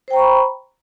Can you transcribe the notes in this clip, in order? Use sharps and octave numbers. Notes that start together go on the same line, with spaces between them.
C5 G5 A#5 B5 C#6